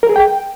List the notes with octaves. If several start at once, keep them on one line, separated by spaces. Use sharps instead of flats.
A#4
G#4
G5